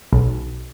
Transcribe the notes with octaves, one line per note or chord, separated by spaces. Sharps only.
B1